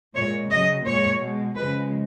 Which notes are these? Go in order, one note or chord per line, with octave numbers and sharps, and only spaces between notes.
A#2 G#3 C#5
C#3 F#3 D#5
A#2 G#3 C#5
B2 G#3
C#3 F3 G#3 B4